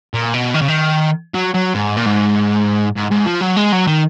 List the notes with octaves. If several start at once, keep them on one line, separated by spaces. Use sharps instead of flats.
A#2
B2
D#3
C#3
D#3
F#3
F#3
G#2
A#2
G#2
G#2
G#2
F3
F#3
G#3
F#3
D#3